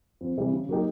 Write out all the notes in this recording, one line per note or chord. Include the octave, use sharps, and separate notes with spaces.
F2
C3 E3 G3
C#3
F#3 A#3 D#4 G4